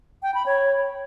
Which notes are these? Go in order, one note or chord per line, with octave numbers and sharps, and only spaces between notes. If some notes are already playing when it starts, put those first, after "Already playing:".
G5
B5
C#5